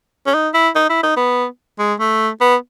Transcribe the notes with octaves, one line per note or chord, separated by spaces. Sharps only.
C#4
D#4
E4
D#4
E4
D#4
B3
G#3
A3
B3